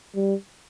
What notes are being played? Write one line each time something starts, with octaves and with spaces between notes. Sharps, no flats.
G3